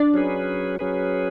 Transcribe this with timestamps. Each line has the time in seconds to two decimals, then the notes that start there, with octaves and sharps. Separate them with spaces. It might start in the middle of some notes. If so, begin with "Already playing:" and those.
Already playing: D4 D5
0.14 F#3 C#4 G#4 B4
0.79 F#3 C#4 G#4 B4